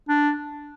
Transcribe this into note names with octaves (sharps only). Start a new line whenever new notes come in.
D4